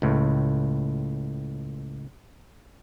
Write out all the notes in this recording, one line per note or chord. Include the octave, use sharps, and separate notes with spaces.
C#2 A2